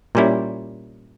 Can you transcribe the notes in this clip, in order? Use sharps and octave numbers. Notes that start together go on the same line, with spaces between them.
A#2 G3 C#4 E4